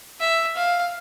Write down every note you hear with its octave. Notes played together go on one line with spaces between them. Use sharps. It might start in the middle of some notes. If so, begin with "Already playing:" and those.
E5
F5